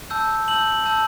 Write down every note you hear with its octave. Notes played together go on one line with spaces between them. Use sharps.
A5 E6 G6
A5 E6 G6 F#7
A5 E6 G6